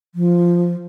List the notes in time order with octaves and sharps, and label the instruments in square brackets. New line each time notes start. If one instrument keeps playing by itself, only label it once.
[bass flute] F3